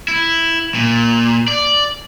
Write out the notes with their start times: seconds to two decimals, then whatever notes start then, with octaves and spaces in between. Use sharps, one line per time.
0.08 E4
0.75 A#2
1.48 D5